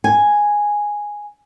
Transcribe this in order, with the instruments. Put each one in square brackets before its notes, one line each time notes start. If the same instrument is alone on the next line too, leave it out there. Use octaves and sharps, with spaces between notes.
[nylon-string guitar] G#5